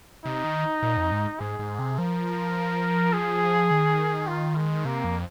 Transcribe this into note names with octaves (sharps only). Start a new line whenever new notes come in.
C3 D#4
D#3
A#2
F2
G#2
G#2 G#4
G#2
C3
F3 A#4
G#4
D#3
F4
G#3
C3 A#3
F2